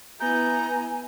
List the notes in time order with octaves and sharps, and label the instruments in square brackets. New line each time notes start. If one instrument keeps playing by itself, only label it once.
[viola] B3 E4 [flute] G#5 [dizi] A#5 [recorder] G6